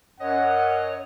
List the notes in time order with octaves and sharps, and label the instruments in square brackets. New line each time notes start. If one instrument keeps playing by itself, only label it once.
[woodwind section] F#2 D#5 [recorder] C#5 [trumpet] F#5